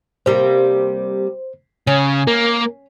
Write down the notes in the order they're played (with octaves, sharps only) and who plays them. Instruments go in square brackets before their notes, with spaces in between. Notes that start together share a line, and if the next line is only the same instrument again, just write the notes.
[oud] C3 G3 A#3 [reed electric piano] C5
[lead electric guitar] C#3 [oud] C#4
[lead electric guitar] A#3 [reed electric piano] A#4